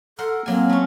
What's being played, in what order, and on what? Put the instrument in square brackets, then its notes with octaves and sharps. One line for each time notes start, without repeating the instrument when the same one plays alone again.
[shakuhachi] A4 [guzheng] A#4 F#5 C6
[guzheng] F#3 G#5 [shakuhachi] A#3 [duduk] C4
[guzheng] A3 C#4